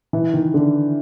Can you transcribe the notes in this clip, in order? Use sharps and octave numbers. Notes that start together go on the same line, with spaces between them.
E3
D#3
D3